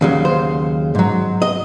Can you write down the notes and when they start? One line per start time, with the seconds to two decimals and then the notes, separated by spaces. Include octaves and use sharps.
0.01 D#2 C#3 F#3
0.25 C5
0.95 G#2 F#3
1.42 D#5